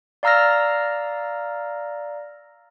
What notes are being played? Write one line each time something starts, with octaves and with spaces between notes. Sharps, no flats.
D5 F5 A#5 E6 F6 A#6